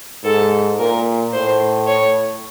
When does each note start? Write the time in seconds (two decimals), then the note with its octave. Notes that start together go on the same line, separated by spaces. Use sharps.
0.24 G#2 A4
0.79 A#2 A#4
1.33 A2 C5
1.87 C#5